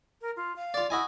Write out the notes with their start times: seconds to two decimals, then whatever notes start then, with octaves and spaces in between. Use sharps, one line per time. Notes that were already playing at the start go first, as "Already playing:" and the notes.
0.21 A#4
0.36 F4
0.56 F5
0.74 F4 D5
0.90 E4 F#4 D#5 G#5